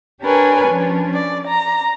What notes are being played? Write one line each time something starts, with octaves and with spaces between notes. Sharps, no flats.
D4 G4 A#4 B4 C#5 G#5
F3 C#4 D4
D5
A#5